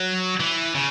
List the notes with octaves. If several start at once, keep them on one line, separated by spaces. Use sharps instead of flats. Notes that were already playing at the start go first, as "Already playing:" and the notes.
Already playing: F#3
E3
C#3